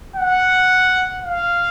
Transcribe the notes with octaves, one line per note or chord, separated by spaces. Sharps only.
F#5
F5